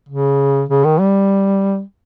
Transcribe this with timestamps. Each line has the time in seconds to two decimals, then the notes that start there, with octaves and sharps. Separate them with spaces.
0.09 C#3
0.69 C#3
0.84 D#3
1.00 G3